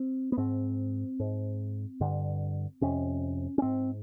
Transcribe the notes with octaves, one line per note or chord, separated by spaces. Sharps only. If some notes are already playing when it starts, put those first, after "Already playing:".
Already playing: C4
B3
G#2 C4
G#2
G2 D3
F2 C3 C#4
C#4
G#2 C4